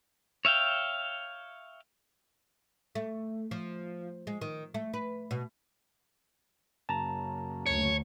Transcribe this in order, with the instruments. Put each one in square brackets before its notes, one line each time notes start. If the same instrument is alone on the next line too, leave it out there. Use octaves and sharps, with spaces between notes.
[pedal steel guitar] C#5 E5 F5 G5
[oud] A3
F3
G#3
D#3
A3
B4
B2
[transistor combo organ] F#2 C#3 A#3 [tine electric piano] A5 A#5
[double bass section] D2 [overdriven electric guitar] C#5